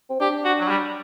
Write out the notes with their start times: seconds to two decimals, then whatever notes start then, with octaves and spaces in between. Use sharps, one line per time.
0.10 C4
0.20 D4 G4
0.45 F#4
0.60 F#3
0.69 G3